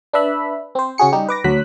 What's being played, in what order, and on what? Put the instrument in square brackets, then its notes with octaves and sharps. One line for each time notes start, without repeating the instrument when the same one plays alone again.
[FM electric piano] D4 B4 E5 B5
C4 C5
C#3 C#4 F#4 G#4 C#7
G3 D#4 G4
B4 D6 A#6
D2 F#3 F#6 B6